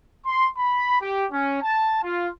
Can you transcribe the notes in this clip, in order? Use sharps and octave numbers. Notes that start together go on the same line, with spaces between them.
C6
B5
G4
C#4
A5
F4